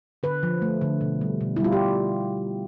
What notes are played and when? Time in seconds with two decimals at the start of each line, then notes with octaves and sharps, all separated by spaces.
0.23 D3 B4
0.43 F3
0.62 A3
0.81 D3
1.01 B2
1.21 G3
1.41 B2
1.56 E4
1.60 G3 F4
1.73 G4